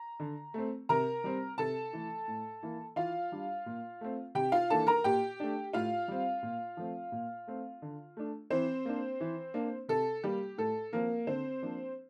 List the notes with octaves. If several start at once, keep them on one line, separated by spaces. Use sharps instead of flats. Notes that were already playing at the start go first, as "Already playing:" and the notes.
Already playing: A#5
D3
A3 C4
C3 A#4 A#5
G3 C4
C3 A4 A5
E3 A3
A2
E3 A#3
E3 F4 F5
G3 D4
A#2
A3 C4
C3 G4 G5
F4 F5
E3 A#3 D4 A4 A5
A#4 A#5
A#2 G4 G5
A3 D4
A2 F4 F5
G3 C4
A#2
F3 A3 C4
A#2
A3 C4
D3
A3 D4
E3 C4 C5
A#3 D4
E3
A#3 D4
C3 A4
G3 A#3 G4
A2 A4
F3 A#3 C4 A#4
D3 C4 C5
F3 A#3 D4